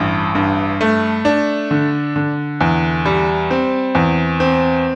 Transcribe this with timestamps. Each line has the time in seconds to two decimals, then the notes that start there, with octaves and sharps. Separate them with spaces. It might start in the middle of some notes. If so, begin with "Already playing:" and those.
Already playing: A1 G2
0.35 G2
0.81 A3
1.25 D4
1.71 D3
2.16 D3
2.61 E2
3.06 G3
3.51 C4
3.95 E2
4.40 C4